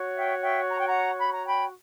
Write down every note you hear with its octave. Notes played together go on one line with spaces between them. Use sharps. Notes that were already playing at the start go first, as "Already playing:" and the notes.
Already playing: F#4 C#5
E5 G5
E5 G5
A#5
G5
F#5 A#5
B5
A#5
G5 B5